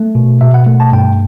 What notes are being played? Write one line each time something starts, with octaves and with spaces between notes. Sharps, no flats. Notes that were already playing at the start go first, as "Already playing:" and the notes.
Already playing: A3
B2
B2 E5
F#5
A3
A5
G2 G5